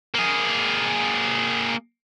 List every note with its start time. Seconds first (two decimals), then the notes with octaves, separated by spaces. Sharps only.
0.15 A#3 G#4